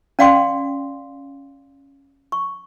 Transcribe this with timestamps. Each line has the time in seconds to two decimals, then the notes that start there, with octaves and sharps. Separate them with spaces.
0.19 C#4 D5 F5 G5 C6 D6
2.32 C#6